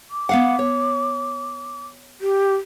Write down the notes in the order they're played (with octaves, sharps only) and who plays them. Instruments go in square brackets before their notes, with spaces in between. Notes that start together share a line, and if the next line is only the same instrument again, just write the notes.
[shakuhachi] D6
[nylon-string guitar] B3 F5 F#5
C#5
[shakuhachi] G4